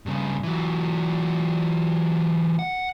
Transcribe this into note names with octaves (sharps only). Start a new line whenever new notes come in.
G2 C#3
E3 F#3
F#5